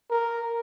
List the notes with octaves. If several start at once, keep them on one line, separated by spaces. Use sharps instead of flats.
A#4